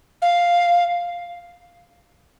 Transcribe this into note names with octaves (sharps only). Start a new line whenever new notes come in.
F5